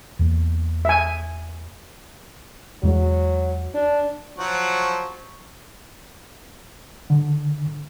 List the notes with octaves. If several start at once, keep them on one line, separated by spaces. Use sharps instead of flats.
E2 A#3
E5 G#5
E2 F#3 G#3
D4
F3 F#3 F#4
D3